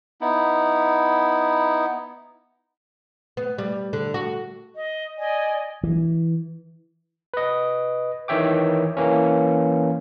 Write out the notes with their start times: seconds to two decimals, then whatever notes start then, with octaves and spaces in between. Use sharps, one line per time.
0.21 B3 D#4 E4
3.37 B3
3.58 G3
3.93 D3
4.14 F#4
4.75 D#5
5.17 D5 D#5 G#5
5.83 E3
7.34 B4 D#5
8.28 D#3 E3 C#5 E5 G5 D6
8.97 E3 A#3 C#4